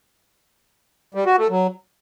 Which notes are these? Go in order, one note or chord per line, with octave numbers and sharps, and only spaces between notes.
G3
F#4
A3
F#3